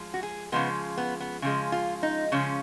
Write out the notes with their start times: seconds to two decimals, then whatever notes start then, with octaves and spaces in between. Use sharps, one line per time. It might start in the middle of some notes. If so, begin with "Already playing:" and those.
Already playing: F3 G#3
0.14 F#4
0.23 G#4
0.52 C#3 F3 G#3 B3
0.98 B3
1.21 B3
1.42 C#3 F3 G#3
1.72 F4
2.03 D#4
2.32 C#3 F3 G#3 C#4